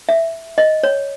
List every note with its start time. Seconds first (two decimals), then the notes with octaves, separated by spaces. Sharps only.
0.09 E5
0.58 D#5
0.83 C#5